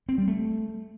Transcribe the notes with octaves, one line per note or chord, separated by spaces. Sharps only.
C4
G3
A3